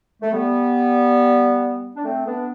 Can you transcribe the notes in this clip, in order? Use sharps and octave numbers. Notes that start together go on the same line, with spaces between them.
A3
G3 B3
D4
A3 C4
B3 D4